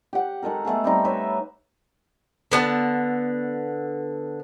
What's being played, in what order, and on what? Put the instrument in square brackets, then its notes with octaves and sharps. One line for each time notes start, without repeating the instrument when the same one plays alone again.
[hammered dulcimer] G4 F#5
D#3 G#3 A4 A#4
G#3 A3 B3 G#4
G3 C4 D#4
D#4 B4 C#5 E5
[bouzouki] D3 B3 A5